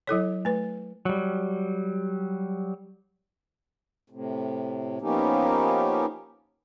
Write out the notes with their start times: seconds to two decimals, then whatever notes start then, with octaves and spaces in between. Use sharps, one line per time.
0.07 F#3 E4 A4 C#5
0.45 A3 B4
1.05 F#3 G3
4.10 A2 C3
5.01 F3 A#3 B3 C#4 D#4 G4